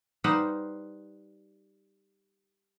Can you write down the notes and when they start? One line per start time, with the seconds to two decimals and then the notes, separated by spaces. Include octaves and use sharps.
0.24 G3 D#4 B4 C5 F5 F#5